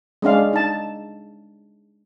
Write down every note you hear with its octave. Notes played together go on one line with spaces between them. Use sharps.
G#3 C#4 D4 F5
D#4 A5